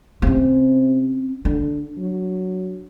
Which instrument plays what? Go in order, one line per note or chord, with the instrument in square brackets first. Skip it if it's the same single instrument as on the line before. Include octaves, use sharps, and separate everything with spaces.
[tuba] C3 [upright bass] C4 C#4
[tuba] D3 [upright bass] D4
[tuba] F#3